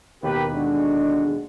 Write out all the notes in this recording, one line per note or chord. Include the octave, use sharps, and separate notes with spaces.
D#2 B2 G4 A#4 B4
D3 G#3 D4 F#4